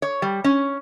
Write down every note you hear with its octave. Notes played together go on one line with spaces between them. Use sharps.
C#5
G3
C#4